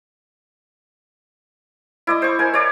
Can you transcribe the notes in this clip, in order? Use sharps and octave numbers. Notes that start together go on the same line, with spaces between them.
E4 D5 D#5
C5 C#6
A#4 G#5
C#5 D5